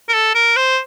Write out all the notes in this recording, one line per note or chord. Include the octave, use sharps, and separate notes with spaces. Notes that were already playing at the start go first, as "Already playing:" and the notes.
A#4
A4
A#4
C5